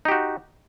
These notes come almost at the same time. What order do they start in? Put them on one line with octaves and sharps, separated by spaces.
D#4 G4 F#4